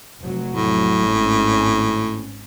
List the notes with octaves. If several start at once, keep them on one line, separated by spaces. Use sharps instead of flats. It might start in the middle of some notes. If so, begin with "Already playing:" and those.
F1 F#3
A2
G#1 C#4